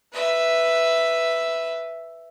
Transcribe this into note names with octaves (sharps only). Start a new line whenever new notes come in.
B4 E5